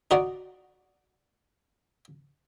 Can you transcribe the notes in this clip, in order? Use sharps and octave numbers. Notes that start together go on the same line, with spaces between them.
D#4 F#4 D5